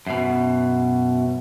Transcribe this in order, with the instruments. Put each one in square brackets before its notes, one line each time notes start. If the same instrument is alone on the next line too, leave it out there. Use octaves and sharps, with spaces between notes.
[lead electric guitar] F#2 B2